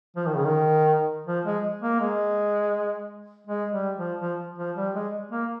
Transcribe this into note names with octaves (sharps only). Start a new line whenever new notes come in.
F3
D#3
C#3
D#3
F3
G#3
A#3
G#3
G#3
G3
F3
F3
F3
G3
G#3
A#3